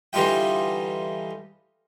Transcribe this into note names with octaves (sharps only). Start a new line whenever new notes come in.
D3 E3 G3 D#4 F4 G5